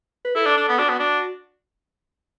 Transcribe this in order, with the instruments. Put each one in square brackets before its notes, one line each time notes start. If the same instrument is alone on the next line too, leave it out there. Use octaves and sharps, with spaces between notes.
[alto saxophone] B4
[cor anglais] E4 [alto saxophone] A4
[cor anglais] D4
D4
B3
[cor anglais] D4 [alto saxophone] F#4
[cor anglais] B3
D4